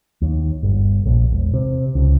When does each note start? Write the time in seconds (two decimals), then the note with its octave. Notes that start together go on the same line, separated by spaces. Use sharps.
0.22 D#2
0.63 G1
1.06 A#1
1.32 E1
1.54 C3
1.95 C#2